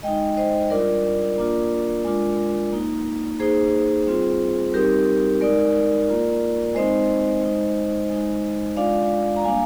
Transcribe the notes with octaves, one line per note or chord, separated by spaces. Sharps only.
G#3 D#4 D#5 G5
C5 D#5
G3 D4 F4 A#4 D5
A#3 D4 F4
G#3 D4 F4
A#3 D#4
A#3 D#4 G#4 C5
G3 C4 F4
G3 C4 D#4 G4 A#4
G#3 D#4 A#4 D5
A#3 F4
G#3 C4 D#4 C5 D#5
G#3 D#4
G#3 D#4
G#3 D4 F4 D5 F5
A#5
G3 A#3 D4 F5 G#5